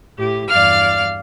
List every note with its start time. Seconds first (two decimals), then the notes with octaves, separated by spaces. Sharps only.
0.17 A2 G4
0.49 E2 G2 D5 F5 F6